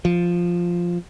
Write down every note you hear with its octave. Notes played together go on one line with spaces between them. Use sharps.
F3